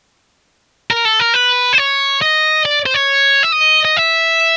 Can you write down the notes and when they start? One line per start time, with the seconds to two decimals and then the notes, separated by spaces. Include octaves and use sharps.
0.91 A#4
1.05 A4
1.20 A#4
1.34 B4
1.73 C5
1.78 C#5
2.22 D#5
2.65 D5
2.86 C5
2.94 C#5
3.43 E5
3.52 D#5
3.85 D#5
3.97 E5